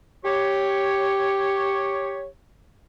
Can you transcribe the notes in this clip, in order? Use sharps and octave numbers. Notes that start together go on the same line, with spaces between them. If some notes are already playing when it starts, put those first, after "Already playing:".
G4 C#5